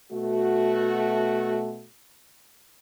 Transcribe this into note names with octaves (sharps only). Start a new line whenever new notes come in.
B2 A3 F#4